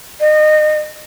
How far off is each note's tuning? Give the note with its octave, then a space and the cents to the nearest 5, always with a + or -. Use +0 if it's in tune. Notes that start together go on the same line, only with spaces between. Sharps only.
D#5 -30